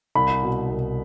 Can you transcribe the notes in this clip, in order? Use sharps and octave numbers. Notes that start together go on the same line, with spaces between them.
C2 B5
B2
C2